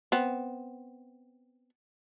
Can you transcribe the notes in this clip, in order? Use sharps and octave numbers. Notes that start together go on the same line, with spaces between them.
B3 C4